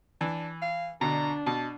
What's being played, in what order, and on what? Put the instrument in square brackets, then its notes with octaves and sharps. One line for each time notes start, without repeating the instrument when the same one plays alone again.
[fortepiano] E3 [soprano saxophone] D4
[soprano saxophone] F5
[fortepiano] D2 B2 [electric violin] D4 [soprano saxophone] A#5
[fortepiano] B2 [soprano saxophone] A5